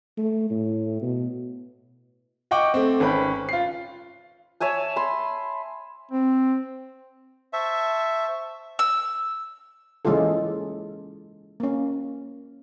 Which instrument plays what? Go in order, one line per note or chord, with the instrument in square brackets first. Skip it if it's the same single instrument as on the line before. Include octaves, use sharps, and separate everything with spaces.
[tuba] A3
A2
B2
[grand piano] D#5 F#5 G5 C#6 D6
A3 C4
G#1 C#4 B4 G5 B5
F4 C7
[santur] C#5 E5 G#5 A5
B5 C6
[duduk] C4
[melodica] C5 A5 C#6 [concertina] E5
[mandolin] E6
[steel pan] C#3 E3 G#3 A#3 F4 A4
A#3 C#4